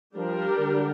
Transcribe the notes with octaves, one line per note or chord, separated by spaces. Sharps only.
F3 G3 D4 G4 A#4
D3